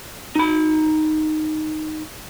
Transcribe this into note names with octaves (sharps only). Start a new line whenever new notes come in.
D#4 B5